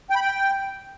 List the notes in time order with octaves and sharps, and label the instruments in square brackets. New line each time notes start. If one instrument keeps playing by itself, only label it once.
[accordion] G5
B5
G5